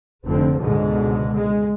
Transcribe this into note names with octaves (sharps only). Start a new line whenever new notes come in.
F1 F2 D3 C4
C#2 G#2 B2 D3 G#3
G#3